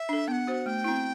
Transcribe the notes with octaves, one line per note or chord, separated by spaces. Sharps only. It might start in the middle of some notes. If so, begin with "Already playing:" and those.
Already playing: E5
D4 A4
B3 F#5 G5
F#4 C5
A3 G5
C4 E4